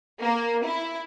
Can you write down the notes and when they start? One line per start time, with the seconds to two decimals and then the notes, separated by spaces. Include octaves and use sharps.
0.21 A#3
0.65 E4